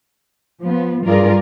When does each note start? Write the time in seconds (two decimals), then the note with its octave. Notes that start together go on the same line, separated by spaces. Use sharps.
0.60 F3 B3
1.06 G2 F4 G#4 A#4 D5